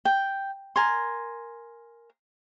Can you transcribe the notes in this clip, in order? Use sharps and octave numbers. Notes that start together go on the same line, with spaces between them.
G5
A#4 G#5 C6